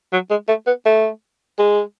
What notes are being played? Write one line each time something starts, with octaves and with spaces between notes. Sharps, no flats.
F#3
G#3
A3
B3
A3
G#3